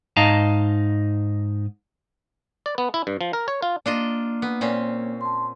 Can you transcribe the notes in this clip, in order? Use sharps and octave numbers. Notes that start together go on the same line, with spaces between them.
G#2 D#4 D#5 F5 A5 A#5
D5
B3
E4
G2
F3
A#4
C#5
F4
A#3 D4 F4 D#5
B3
A#2 C4 C#4
A5 C6